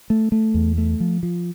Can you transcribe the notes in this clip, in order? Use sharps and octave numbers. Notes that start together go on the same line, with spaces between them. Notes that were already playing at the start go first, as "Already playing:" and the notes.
A3
A3
E2
A3
F3
F3